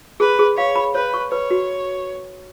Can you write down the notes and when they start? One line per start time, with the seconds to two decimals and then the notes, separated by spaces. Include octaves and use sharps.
0.20 G#4 B4
0.39 G#4
0.58 C#5 F5
0.76 B5
0.95 B4 C#5
1.14 C#6
1.32 B4 C#5
1.51 F#4